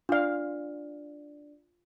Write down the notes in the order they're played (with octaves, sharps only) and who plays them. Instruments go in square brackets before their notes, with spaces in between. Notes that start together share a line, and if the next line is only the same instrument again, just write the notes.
[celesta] D4 D5 [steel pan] F4 F5